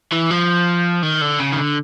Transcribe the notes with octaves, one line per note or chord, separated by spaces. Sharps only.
E3
F3
D#3
D3
C#3
D#3
D3